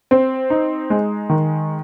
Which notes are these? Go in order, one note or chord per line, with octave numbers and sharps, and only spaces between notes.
C4
D#4
G#3
D#3